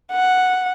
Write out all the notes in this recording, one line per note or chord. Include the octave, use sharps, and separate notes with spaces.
F#5